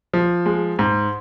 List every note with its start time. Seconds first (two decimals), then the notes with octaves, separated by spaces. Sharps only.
0.14 F3
0.46 G#3
0.79 G#2